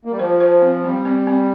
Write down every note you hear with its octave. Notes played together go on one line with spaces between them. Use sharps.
A#3
G3
F3 C5
C5
C4
G3 C4
C4
C4